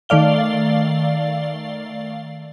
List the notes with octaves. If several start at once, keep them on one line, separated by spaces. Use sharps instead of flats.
D#3 A3 D5 F5 G7